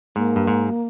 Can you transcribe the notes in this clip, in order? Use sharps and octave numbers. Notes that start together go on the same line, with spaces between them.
G#2 A#3
G2
G#2